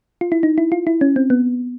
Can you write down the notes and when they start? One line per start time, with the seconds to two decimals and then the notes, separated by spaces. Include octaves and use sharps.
0.21 F4
0.32 E4
0.43 D#4
0.58 E4
0.72 F4
0.87 E4
1.01 C#4
1.16 C4
1.30 B3